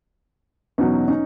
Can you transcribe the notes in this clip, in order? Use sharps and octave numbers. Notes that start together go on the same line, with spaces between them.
E2 B2 F#3 C#4 D#4
C#4 D#4